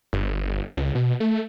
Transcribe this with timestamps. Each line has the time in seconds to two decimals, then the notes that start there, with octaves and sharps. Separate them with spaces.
0.13 G1
0.77 C#2
0.95 B2
1.20 A3